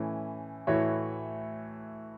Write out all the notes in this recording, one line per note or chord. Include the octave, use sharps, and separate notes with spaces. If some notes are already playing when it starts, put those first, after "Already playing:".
Already playing: A2 E3 A3 C#4
A2 E3 A3 F#4 C#5